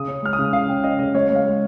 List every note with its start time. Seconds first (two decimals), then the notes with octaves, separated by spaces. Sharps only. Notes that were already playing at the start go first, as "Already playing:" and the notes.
Already playing: C#3 D#6
0.08 C#4
0.23 G#3 F6
0.33 D#6
0.39 C#3
0.53 C#3 F5
0.69 C#4 G5
0.84 C#4 D#5
0.99 C#3 D#5
1.14 G#3 C#5
1.30 G#3
1.35 F5
1.45 G#3